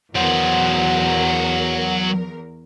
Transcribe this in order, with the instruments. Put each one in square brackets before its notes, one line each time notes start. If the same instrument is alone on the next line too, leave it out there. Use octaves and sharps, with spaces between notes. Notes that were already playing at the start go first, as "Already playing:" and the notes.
[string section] E2 A#4 [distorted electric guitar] F#3 C5 [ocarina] F#5